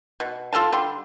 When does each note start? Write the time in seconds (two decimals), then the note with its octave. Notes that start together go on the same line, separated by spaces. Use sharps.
0.20 B2
0.53 F4 A4 F5 A5
0.72 D3 G3 C6